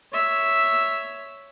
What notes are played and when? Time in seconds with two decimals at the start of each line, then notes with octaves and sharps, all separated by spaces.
0.13 C#5 E5